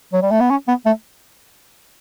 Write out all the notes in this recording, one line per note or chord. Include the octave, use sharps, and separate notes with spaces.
F#3
G3
A3
B3
C#4
B3
A3